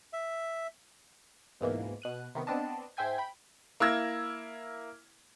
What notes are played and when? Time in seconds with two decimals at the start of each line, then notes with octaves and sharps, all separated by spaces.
0.13 E5
1.61 C#2 G#2 B2 E3 A#3
2.02 B2 F#6 D#7
2.35 C3 D#3 B3
2.47 B3 C4 D4 D#5 A5
2.97 G#2 C5 E5 G5 G#5 G#6
3.18 G5 B5
3.80 A#3 E4 E6 G#6 A#6